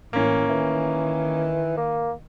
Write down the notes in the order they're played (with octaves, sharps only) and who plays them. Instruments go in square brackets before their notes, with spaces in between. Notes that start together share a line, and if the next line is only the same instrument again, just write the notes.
[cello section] A2 E3 [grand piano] A#3 C#4
[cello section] D#3 [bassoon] E3
[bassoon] A#3